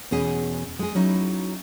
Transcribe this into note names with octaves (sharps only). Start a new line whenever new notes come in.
E2 B2 C#4 G#4 D#5
G#3 G#4
F#3 C#4 D#4 E4